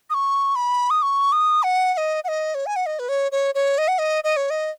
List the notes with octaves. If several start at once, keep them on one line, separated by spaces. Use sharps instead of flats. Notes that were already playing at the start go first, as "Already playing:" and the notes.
D#6
C#6
B5
D#6
C#6
D#6
F#5
F#5
D#5
F#5
D#5
C#5
G#5
F#5
D#5
B4
C#5
C#5
C#5
D#5
F#5
D#5
D#5
C#5
D#5